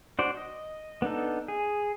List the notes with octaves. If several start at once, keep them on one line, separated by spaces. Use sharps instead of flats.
D4 F#4 C5 D5
D#5
B3 D4 D#4 A4
G#4